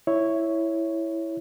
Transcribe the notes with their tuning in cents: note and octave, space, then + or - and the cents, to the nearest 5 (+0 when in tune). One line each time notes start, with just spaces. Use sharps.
E4 +0 C#5 +0